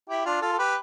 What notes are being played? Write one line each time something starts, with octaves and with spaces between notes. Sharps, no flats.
E4 G4
D4 F4
F4 A4
A4
G4 B4